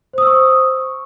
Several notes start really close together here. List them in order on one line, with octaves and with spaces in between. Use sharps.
C5 D#6 E6 C#6